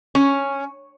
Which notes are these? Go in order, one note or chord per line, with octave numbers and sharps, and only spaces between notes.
C#4